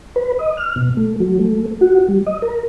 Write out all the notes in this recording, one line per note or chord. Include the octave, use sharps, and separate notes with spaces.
B4
D#5
F6
B2
A3
F#3
A3
F#4
G3
D#5
A#4